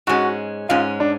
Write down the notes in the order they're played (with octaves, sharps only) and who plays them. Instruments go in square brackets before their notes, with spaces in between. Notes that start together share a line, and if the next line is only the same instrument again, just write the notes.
[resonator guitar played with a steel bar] G#2 G#3 C#4 [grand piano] F#4
[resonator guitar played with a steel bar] G#2 G#3 C#4 [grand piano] F4
[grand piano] D4